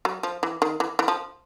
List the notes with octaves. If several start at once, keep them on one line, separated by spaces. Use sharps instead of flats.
F#3
F3
E3
D#3
E3
E3
F3